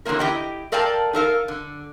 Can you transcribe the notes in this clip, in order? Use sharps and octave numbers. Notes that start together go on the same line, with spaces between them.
E2 D3 D#3 F#3 A#3 A#4
E4 G4 D#5 G5
A4 A#4 D5 F5 G5 A5
D#4 A4 A#4 F5
D3